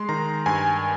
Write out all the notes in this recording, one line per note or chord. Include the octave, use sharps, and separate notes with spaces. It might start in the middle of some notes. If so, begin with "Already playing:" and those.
Already playing: G#3 C6
D#3 A#5
G2 G#5